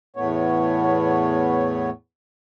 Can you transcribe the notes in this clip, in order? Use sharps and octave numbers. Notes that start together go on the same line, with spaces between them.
E2 A2 A3 B3 C#5